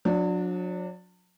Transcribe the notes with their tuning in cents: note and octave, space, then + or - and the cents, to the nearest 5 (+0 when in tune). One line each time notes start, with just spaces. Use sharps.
F#3 -40 D4 +0